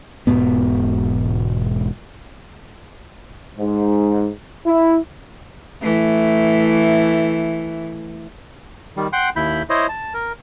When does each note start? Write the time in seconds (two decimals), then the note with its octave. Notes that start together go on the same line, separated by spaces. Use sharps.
0.27 E1 G#2 B2 B3
3.59 G#2
4.65 E4
5.81 E3 A3
8.97 D#3 G3
9.13 F#5 G5 C6
9.36 D#2 E4 B5 G6
9.70 E4 C5 C#5 D#5
9.89 A5
10.14 A#4